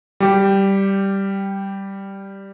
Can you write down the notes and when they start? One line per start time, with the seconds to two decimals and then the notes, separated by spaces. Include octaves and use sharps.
0.20 G3 G4